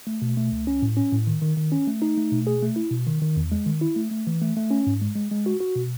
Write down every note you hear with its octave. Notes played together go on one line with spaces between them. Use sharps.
A3
B2
A3
C#2
C#4
A2
C#4
A2
D#3
D#3
D#3
C#4
A3
D#4
A3
B2
G#4
A3
E4
B2
D#3
D#3
E2
G#3
D#3
E4
A3
A3
E3
A3
A3
C#4
G#2
G#3
G#3
G#3
F#4
F#4
B2